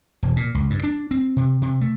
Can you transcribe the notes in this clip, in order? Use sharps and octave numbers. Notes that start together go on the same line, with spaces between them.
E1
A#2
C#2
G2
D4
C4
C3
C3
A3